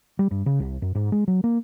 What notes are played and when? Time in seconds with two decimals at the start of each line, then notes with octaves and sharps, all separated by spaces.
0.19 G3
0.31 G2
0.46 C#3
0.60 C2
0.82 F#2
0.95 G#2
1.12 G#3
1.28 F#3
1.44 A#3